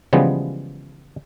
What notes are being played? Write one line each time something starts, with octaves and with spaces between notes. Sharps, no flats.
C#3 E3 F3 G3 G#3 B3